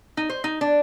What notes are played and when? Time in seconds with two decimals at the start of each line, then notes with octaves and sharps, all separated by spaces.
0.17 D#4
0.30 C5
0.44 D#4
0.61 D4